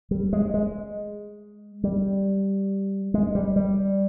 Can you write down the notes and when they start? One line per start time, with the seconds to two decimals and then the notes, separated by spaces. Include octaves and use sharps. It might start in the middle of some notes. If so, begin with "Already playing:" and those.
0.11 G3
0.33 G#3
0.54 G#3
1.84 G3
3.14 G#3
3.35 G3
3.56 G3